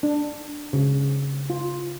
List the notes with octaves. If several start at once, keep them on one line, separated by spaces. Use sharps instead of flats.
D4
C#3
F4